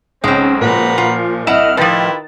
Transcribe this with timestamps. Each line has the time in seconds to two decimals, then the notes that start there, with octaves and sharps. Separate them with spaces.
0.24 B1 C#3 G#3 C4 C#4
0.61 A#2 F3 F#4 B4 A#5
0.98 F4
1.47 C2 E4 D#5 F#5 F6 E7
1.77 A2 D#3 F3 E4 F4 G4 B4 A6